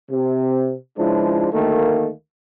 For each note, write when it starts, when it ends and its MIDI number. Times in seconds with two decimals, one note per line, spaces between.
0.10 0.73 48
0.97 1.48 37
0.97 1.48 53
0.97 1.48 56
0.97 1.48 62
0.97 1.48 64
1.52 2.09 38
1.52 2.09 51
1.52 2.09 57
1.52 2.09 58